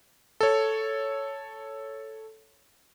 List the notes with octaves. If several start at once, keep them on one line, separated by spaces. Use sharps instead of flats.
A4 C#5